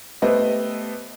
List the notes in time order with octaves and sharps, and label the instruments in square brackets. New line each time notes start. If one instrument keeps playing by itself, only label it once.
[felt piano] A3 B3 G4 B4 C5 D#5